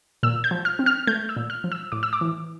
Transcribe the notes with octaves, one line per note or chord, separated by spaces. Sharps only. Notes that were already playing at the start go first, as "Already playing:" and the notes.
A#2 E6
G6
F3
F6
C4
F6
A3 G6
E6
A#2
F6
F3
E6
A2 D6
E6
D6
E3